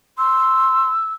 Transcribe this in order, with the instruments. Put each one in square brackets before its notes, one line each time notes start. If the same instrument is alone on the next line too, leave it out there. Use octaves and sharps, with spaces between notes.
[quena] C6 [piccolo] E6